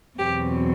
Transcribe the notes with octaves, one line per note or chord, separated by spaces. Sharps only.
E2 B2 F#3 C4 G4